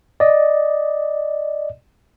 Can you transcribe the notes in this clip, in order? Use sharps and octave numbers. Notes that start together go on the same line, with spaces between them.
D5 D#5